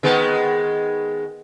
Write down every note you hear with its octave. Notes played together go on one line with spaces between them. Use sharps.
D#3 G#3 B3